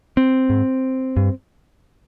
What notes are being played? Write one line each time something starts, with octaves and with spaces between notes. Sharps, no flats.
C4
G#2
G2